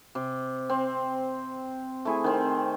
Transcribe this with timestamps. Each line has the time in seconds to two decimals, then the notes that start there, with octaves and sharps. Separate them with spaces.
0.15 C3
0.69 C4
2.05 A3 E4 G#4
2.24 D#3 C4